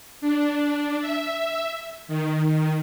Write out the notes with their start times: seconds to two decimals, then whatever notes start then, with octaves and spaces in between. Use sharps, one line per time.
0.21 D4
1.01 E5
2.08 D#3